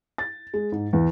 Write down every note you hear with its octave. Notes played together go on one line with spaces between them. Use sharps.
A6
G#3
G#2
E2